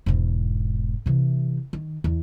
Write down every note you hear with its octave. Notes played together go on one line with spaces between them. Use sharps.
E1 G#2
C3 E3
D#3
E2